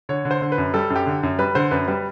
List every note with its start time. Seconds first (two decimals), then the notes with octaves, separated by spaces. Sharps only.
0.09 D3 C#5
0.25 D3
0.31 C5
0.41 D3
0.52 B4
0.58 F#2
0.74 G3 A4
0.90 F#2
0.95 G4
1.06 D3
1.23 F#2
1.39 G3 B4
1.55 D3 C5
1.71 F#2 B4
1.88 G3 B4